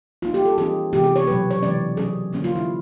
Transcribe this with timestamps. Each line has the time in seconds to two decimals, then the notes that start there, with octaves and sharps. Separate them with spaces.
0.22 F3 A#3 D#4 F4
0.34 G4
0.46 A4
0.58 E3 G3 C4 D#4 G#4
0.93 C3 E3 G#3 B3 G4
1.04 G#4
1.16 C#5
1.27 B2 F#3 A3 B4
1.51 C#5
1.62 C3 E3 G#3 C#4 D5
1.97 F#3 A3 C#4 G#4
2.33 D3 F3 A#3 C#4
2.44 F4
2.55 E4